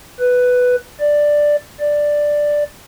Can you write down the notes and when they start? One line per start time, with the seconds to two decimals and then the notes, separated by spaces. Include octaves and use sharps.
0.20 B4
1.00 D5
1.80 D5